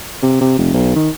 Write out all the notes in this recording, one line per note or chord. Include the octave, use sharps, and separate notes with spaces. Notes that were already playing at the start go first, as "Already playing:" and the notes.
C3
C3
F1
B1
D#3